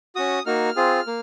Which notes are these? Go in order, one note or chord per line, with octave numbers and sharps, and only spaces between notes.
C#4 F#4 D#6
A#3 D#4 F#4 F6
C4 F4 G#4
A#3